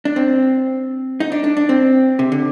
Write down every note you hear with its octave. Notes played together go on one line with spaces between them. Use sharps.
D4
C4
D#4
D4
D4
D4
C4
C3
D3